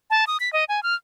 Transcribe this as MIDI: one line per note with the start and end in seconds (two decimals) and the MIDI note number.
0.10 0.25 81
0.27 0.37 87
0.40 0.52 95
0.53 0.64 75
0.69 0.83 80
0.83 0.94 89